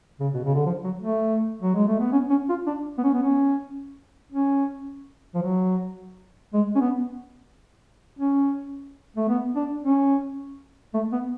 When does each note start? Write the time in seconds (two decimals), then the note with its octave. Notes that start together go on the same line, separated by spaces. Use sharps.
0.20 C#3
0.34 B2
0.44 C#3
0.55 D3
0.66 F3
0.84 F#3
1.02 A3
1.62 F#3
1.75 G#3
1.87 A3
2.00 B3
2.12 C#4
2.30 C#4
2.49 F4
2.67 D4
2.98 B3
3.04 C#4
3.14 B3
3.22 C#4
4.32 C#4
5.35 F3
5.43 F#3
6.53 G#3
6.76 C#4
6.81 B3
8.19 C#4
9.16 A3
9.29 B3
9.56 D4
9.83 C#4
10.94 A3
11.12 B3